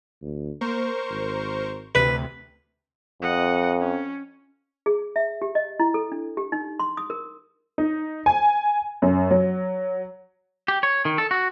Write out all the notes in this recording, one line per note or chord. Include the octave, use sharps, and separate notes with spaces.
D2
A#3 A#4 C5 C#6
G#1
D2 C3 B4
F2 D#5 F#5
C#4
G#4
E5
G4
D#5
E4
A4
D4
G4
D#4
C6
D#6
A#4
D#4
G#5
F#2
F#3
G4
C#5
D#3
A4
F#4